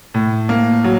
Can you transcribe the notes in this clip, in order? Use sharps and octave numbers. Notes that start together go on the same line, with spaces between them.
A2
A#3
F#3